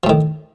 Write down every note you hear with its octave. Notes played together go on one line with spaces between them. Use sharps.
A2 D#3 F3